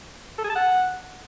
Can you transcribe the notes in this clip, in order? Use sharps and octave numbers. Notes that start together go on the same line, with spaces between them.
A4
G#4
A5
F#5